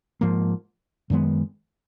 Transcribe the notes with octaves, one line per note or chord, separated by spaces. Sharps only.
G#2 F3 A#3
F#2 D#3 G#3 B3